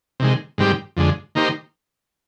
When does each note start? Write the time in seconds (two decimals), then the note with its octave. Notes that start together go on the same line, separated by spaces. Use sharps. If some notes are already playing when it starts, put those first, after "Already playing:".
0.20 C3 D#3 G#3
0.58 G#2 D#3 G3 C4 G4
0.97 F2 D3 G#3
1.35 D#3 A#3 D#4 G4 C5